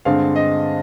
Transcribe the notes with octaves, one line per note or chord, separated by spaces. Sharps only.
G2 D3 G#3 C4 F5
D#5